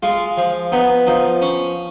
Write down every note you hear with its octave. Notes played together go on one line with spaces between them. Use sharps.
G#3 F4
F3
B3 D#4
F3 D#4
C#4